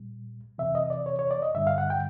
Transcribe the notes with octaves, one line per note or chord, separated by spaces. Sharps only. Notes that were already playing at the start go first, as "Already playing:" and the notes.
Already playing: A#2 G3
F2 C3 E3 E5
D#5
D5
C#5
C#5
D5
D#5
G2 D3 G3 E5
F5
F#5
G5